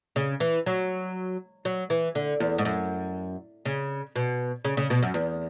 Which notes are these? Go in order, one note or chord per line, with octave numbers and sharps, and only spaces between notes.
C#3
E3
F#3
F#3
E3
D3
E2
G#2
F#2
C#3
B2
C#3
C#3
B2
F#2
E2